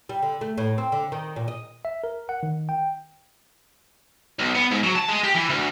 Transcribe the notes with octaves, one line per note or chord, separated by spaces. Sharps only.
G3
D3
A3
A2
C4
D3
D#3
A#2
D#5
E5
A#4
F#5
D#3
G5
B1
B3
G#2
F#3
A5
G#3
G4
E3
D2